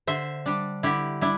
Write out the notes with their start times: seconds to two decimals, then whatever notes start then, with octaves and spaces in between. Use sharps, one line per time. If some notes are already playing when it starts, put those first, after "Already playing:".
0.07 D3 C5 E5
0.46 G3 D4
0.83 D3 E4 G4
1.21 G3 D4 E4